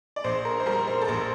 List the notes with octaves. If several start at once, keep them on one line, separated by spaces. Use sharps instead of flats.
D5
A#1 C5
A#4
C5
G3 A#4
C5
A4
A#1 A#4